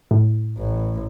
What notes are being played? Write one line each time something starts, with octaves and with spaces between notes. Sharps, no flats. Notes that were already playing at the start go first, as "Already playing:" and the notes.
A2
A1